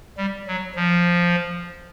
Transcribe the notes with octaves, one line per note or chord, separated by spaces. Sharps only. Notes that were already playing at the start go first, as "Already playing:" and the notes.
G3
F#3
F3